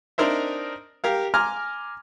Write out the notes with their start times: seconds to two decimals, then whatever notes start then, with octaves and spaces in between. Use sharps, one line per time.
0.18 C4 D4 D#4 A#4 C5 E5
1.04 G4 A#4 F5
1.34 G#5 A#5 C6 D6 F6